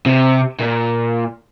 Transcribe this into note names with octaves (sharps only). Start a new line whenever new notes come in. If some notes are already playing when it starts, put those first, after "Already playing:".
C3
A#2